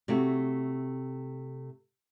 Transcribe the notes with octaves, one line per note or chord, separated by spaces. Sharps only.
C3 A3 E4 F#4 A4